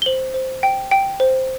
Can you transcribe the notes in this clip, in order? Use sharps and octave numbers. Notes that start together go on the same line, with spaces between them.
G7
C5 F#7
C5
G5
G5
C5